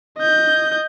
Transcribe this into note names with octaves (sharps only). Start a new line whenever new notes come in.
D#5 G6